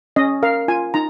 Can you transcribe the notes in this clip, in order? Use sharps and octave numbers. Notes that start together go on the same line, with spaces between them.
C#4 D#5
A#4 F5
F4 G#5
D#4 A#5